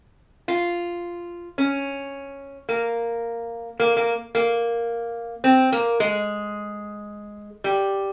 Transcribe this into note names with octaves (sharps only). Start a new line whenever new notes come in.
F4
C#4
A#3
A#3
A#3
A#3
C4
A#3
G#3
G3